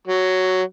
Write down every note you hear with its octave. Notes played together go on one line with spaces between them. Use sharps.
F#3